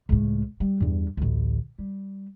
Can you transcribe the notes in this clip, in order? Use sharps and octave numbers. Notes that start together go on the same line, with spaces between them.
C#2 A2
G3
E2 G2
A1 D2
G3